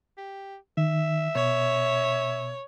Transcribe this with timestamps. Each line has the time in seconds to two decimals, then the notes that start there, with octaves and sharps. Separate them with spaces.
0.17 G4
0.77 D#3 E5
1.35 B2 C#5